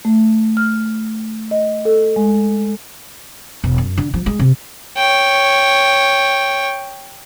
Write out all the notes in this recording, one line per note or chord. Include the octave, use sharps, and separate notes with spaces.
A3
F6
D#5
A4
G#3
E1
F#2
D3
F3
G#3
C3
C#5 G5